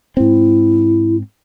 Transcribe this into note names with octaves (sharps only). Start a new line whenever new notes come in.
G#2 C4 E4